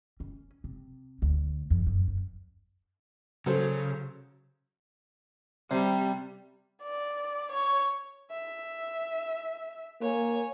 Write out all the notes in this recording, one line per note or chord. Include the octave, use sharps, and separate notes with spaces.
C#4
C3
D2
F2
F#2
F#2
C#3 F#3 A4 C5
C3 G3
D5
C#5 C#6
E5
A#3 C#5 G#5